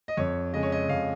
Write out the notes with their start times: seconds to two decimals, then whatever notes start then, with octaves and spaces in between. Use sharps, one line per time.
0.08 D#5
0.17 F2 C#5
0.53 C#3 G#3 D#5
0.63 C#5
0.72 D#5
0.89 F2 F5